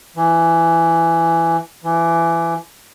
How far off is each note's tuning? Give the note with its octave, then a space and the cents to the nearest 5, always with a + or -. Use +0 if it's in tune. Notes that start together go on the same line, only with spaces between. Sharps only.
E3 +15
E3 +25